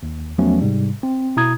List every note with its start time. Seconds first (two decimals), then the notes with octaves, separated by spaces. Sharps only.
0.03 D#2
0.38 E2 F3 F#3 A3 B3 C#4
0.61 G#2 C3 G3
1.03 C4
1.37 B2 E4 A#5 D#6 G#6